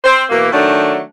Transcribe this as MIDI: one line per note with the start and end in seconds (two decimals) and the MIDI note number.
0.04 0.23 60
0.04 0.23 72
0.29 0.48 47
0.29 0.48 52
0.29 0.48 58
0.52 1.00 51
0.52 1.00 54
0.52 1.00 57
0.52 1.00 62